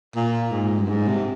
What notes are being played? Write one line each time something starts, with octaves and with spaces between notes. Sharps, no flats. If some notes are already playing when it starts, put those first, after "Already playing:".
A#2
G#2
G2
G#2
C3